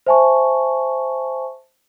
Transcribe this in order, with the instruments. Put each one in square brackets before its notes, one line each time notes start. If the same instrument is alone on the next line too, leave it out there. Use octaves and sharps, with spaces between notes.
[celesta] C5 E5 G#5 A5 C#6